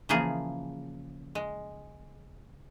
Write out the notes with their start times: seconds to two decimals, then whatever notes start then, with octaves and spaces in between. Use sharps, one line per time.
0.09 C#3 E3 F3 A#3 G#4
1.35 G#3